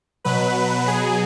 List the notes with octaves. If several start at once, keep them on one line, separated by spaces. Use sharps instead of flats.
B2 F#3 B4
G#4